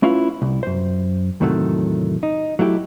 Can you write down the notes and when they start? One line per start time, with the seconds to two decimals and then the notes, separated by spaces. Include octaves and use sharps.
0.02 A3 C#4 E4 F4 B4 F5
0.42 C2
0.63 F#2 C5
1.40 E2 A2 C3 D#3 F#3 A3
2.23 D#4
2.59 F#3 A3 E4 G4